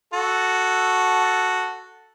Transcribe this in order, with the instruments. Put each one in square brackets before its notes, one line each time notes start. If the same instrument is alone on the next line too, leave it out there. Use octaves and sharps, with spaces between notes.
[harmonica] F#4 A4